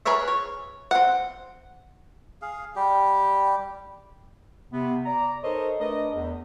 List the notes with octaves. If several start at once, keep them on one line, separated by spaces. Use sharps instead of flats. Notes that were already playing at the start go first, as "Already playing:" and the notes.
G#4 A#4 B4 C#5 E5
C#5
C4 F#5
G#4 F5
G3 G4
C3 B3
D5 A#5
D#4 A4 A#4 C5 C#5 D#5
A3 D4 A#4 B4 D#5
E2